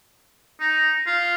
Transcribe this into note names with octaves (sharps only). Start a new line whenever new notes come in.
D#4
F4